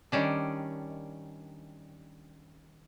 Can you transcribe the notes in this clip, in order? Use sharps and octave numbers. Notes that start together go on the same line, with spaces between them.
D#3 G3 C#4 D4